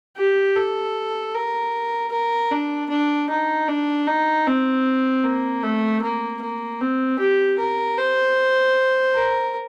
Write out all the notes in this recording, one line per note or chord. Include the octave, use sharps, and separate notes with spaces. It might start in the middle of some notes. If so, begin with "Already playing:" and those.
G4
A4
A#4
A#4
D4
D4
D#4
D4
D#4
C4
A#3
A3
A#3
A#3
C4
G4
A#4
C5
A#4